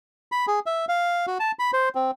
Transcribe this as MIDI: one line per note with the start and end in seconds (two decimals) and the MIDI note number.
0.32 0.46 83
0.48 0.60 68
0.66 0.85 76
0.89 1.26 77
1.27 1.38 66
1.40 1.52 81
1.59 1.71 83
1.73 1.89 72
1.95 2.11 60